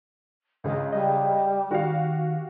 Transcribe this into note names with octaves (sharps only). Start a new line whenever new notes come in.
C#2 C#3 D#5
G3 D#5
D#3 F#4 G4 F5